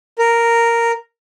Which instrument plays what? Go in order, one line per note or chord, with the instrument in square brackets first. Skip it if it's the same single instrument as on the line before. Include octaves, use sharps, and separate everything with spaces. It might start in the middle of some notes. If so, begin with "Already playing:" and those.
[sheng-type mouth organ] A#4